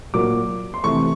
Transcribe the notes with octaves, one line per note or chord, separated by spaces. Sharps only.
A#2 F#3 A#3 D6
C6
C3 E3 A3 C#6